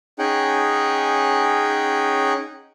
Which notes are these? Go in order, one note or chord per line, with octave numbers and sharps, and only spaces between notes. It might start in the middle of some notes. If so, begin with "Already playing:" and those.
C#4 D#4 G#4 F#5 G5